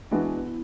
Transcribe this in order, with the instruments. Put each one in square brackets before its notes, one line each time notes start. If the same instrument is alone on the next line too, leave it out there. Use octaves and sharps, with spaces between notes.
[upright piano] E3 G#3 D4 F#4 B4 [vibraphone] B3
[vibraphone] E4